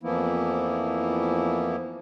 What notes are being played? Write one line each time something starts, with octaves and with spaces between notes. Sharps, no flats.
F2 E3 F3 A#3 B3 E4